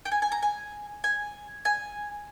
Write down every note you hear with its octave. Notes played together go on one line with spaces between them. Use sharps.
G5
G#5
G#5
A#5
G#5
G#5
G#5